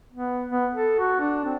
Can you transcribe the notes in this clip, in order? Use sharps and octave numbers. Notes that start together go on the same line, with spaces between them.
B3
B3
A4
F#4
D4
C4